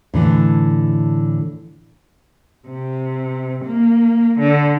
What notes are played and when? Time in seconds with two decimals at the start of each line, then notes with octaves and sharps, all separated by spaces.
0.14 A2 D3 E3
2.68 C3
3.65 A#3
4.39 D3